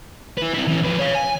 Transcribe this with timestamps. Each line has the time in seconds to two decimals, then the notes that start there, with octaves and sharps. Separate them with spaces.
0.38 E4 B4
0.55 C4 E4
0.68 E3 C#4
0.83 F2 B4
0.99 C#5 F5
1.15 G#5